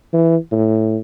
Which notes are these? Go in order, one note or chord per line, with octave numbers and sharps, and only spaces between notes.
E3
A2